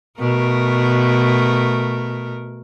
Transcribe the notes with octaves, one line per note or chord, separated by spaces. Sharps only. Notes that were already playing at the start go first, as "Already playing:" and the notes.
B2 A3 A#4